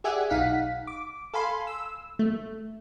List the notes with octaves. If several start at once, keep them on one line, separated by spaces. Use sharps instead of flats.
G4 G#4 D5 E5 F#5 G#5
B1 D#4 F5 F#5 B6
D6
A4 F5 G#5 B5 C6
E6
A3